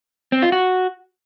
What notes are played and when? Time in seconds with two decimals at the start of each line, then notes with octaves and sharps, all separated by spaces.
0.32 C4
0.42 F4
0.52 F#4